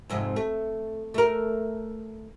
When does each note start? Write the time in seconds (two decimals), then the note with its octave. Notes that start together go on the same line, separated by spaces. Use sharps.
0.09 F2 G#2 C3
0.36 A3
1.14 A3 A#4